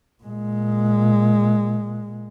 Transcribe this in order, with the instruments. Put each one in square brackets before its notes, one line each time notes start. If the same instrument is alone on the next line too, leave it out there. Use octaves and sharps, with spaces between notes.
[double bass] A#2 G#3